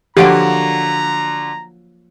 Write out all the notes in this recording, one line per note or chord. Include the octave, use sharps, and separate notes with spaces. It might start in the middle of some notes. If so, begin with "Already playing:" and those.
D3 F3 F#3 A#3 F#4 G4 A#5 D7